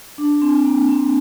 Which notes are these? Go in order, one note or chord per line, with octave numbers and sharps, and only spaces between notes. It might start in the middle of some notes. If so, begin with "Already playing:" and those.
D4
C4
C4
A#3
C4